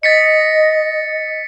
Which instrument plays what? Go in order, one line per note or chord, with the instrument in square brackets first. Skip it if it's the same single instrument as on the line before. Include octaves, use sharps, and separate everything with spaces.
[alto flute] D#5 [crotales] A6 B6 C#7